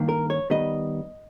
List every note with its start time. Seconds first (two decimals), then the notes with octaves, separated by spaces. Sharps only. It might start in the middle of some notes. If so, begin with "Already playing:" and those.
Already playing: G2 D#3 A#3
0.09 A#4
0.30 C#5
0.50 D#3 G3 B3 D#5